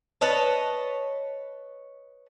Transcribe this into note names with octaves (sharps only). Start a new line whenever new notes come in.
B4 C#5 D#5 A5